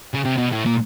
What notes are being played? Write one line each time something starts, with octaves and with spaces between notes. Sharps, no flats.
C#3
C3
B2
A2
A#2